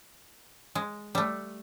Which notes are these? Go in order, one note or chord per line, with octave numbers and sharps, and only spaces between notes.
G#3
G3 A3